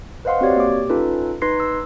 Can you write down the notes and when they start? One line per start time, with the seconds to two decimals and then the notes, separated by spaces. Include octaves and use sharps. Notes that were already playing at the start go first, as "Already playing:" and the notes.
0.25 B4 C5 D#5 F5 F#5 C6
0.41 C4 F#4 G4 C#5 D5
0.57 A#3 G4 D6
0.89 C#4 D#4 F4 A4 B4
1.42 D#4 B4 C6 G#6 A#6 C7
1.60 E6